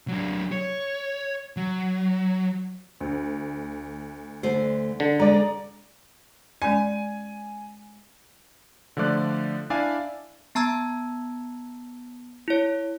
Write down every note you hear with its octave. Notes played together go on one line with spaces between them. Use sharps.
F#3 D4
C#5
F#3
D2
D3 A3 C5
D3
G#3 D5 A#5
G#3 C#4 D5 G#5
D3 F3 A3 D5 F#6
D4 E4 D5 E5 F5 G#5
B3 A5 A#5 E6 G#6
E4 C#5